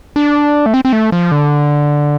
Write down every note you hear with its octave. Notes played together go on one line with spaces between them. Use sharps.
D4
A3
C4
C4
A3
F3
D3